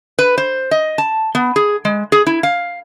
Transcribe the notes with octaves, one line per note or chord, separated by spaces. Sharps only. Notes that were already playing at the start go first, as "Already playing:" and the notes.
B4
C5
D#5
A5
B3
G#4
G#3
G#4
E4
F5